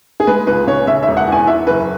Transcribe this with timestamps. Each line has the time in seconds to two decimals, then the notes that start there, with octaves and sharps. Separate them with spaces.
0.20 G#4
0.27 G#3 B4
0.47 C#2 B4
0.67 C#3 C#5
0.87 C#3 E5
1.03 E5
1.08 E1
1.17 F#5
1.28 E2 G#5
1.47 E3 E5
1.67 F#1 B4